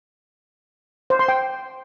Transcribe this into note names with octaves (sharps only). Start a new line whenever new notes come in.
C5
C6
G5